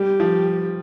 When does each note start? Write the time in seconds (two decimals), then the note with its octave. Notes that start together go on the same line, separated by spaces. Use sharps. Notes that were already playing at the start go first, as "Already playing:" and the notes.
Already playing: G3 G4
0.20 F3